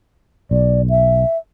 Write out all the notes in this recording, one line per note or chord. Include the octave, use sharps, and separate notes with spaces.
B1 D5
E5